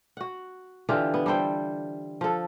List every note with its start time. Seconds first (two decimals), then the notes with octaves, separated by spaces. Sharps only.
0.17 F#4 F#5
0.89 D3 E3 F4 G4
1.14 B3
1.26 G3 A4 C5 G5
2.21 F3 A4